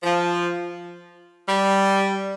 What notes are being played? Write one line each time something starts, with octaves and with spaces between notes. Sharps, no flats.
F3
G3